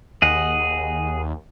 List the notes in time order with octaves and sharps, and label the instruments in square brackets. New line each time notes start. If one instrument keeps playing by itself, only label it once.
[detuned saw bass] D#2 [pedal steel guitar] G#4 D#5 F#5